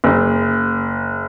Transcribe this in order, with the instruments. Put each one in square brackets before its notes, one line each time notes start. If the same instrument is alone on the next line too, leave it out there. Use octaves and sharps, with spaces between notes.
[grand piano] F#1